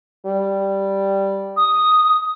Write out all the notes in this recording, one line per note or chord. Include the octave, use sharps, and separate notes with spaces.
G3
D#6